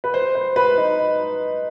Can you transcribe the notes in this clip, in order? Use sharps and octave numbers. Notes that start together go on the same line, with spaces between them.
B4
C5
C5
B4
D#4